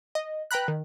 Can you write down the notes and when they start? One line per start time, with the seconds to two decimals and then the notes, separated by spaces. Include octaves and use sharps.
0.15 D#5
0.51 B4 G5 A#5 B5 F#6
0.68 D#3